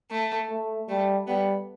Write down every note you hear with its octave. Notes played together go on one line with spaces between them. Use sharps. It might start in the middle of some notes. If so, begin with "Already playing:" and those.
A3
A3
G3 A3
G3 B3